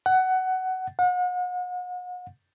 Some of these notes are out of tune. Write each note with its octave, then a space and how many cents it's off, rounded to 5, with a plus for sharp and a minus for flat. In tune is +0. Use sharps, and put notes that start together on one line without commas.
F#5 +15
F#5 -40